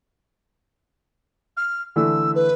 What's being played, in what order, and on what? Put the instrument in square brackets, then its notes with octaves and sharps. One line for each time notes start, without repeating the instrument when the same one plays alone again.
[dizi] F6
[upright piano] D3 E3 A3 [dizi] E6
[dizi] B4